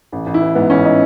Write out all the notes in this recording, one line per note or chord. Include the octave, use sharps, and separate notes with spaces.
A1
A1
E4
E3
G#2 B3
A1 C#4
D#4